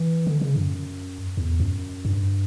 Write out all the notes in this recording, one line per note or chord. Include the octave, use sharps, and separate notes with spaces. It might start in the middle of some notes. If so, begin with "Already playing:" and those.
Already playing: E3
D3
C#3
F#2
E2
F#2
G2